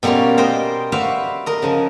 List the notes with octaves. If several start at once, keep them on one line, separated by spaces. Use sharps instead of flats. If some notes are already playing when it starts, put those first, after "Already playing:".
B2 G3 A#3 C#4 F4
A#4 C5 D#5 G5
F#4 B4 C5 D5 E5 F5
A#4 D#5
C#3 F3